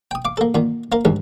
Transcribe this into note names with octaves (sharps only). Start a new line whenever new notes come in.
G5 D#6
F5 D6
A#3 A4
A#2 D#3
A#3 A#4 F5
A#1 D#2 G#2